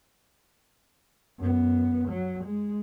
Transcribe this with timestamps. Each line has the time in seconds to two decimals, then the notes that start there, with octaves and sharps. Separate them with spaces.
1.39 F#2 B3
2.09 F#3
2.44 G#3